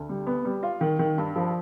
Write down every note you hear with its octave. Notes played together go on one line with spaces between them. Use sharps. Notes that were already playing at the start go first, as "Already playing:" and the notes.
Already playing: D2
G3
B3
G3
F4
D#3
D#3
G2
F3